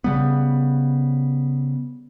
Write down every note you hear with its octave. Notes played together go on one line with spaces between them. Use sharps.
C#3 G3 B3